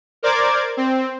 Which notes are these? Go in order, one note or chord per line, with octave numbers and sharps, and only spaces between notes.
A#4 C5 D5 D6 G#6
C4